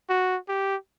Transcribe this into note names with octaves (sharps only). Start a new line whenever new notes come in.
F#4
G4